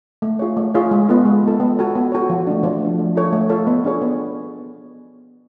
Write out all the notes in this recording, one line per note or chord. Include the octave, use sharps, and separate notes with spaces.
A3
F4 G#4 C#5
A3
F4 G#4 C#5
G#3
B3 F4 A4
G#3
B3 F4 A4
B3
F#4 A4 C#5
B3
F#4 A4 C#5
F3
A3 D4
F3
A3 D4
A3
F4 A4 C#5
A3
F4 A4 C#5
B3
D4 G#4 C#5
B3